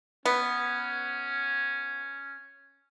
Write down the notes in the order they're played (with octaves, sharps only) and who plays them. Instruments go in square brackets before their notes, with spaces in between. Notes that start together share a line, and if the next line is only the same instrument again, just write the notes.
[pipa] B3 [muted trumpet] C#4